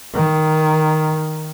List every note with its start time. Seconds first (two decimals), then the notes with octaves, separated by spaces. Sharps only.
0.14 D#3